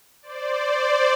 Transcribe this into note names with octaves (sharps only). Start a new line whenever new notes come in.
C5 D5